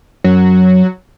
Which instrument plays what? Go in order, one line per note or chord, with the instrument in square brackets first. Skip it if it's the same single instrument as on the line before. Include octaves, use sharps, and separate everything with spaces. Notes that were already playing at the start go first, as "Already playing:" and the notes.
[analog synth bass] F#2 [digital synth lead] F#3